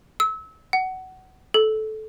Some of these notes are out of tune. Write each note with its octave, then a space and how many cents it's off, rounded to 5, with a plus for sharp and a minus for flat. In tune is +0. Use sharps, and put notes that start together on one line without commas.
E6 -30
F#5 +20
A4 -20